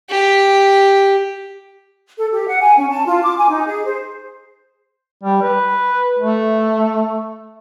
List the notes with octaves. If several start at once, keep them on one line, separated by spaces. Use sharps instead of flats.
G4
A4
G4
F#5
G#5
C#4
A5
F4
D6
G#5
D#4
G#4
C5
G3
B4
A3